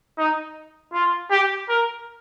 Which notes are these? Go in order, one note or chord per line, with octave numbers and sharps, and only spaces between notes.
D#4
F4
G4
A#4